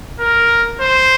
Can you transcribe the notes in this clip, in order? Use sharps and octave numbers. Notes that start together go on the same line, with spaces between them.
A#4
C5